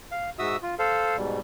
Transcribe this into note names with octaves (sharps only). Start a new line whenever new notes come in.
F5
G#2 F#4 E5 D#6 E6
F4
A4 C5 F5
G#2 B2 G3